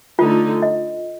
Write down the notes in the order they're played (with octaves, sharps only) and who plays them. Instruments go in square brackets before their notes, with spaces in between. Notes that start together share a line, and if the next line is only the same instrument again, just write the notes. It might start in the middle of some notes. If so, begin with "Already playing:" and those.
[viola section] D3 A3 D#4 [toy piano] F4
[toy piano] D#5